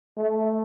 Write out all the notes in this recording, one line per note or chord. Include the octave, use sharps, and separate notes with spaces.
A3